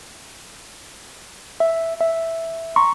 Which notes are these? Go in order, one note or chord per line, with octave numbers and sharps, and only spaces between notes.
E5
E5
A#5 C6 C#6